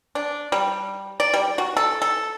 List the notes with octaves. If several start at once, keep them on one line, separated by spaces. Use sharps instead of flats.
D4
G3
D5
G3
F#4
A4
A4